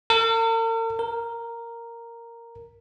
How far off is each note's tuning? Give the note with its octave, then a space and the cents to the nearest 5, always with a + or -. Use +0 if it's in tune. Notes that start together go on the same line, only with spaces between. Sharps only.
A#4 -45
A#4 -5